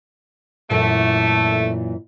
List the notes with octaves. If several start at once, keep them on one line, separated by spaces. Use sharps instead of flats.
F#2 A#2 E3 A3